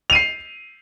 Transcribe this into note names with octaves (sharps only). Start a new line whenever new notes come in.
C7 D#7 F7